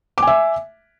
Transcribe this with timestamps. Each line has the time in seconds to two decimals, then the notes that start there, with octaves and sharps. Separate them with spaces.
0.18 D6
0.22 G#5
0.27 E5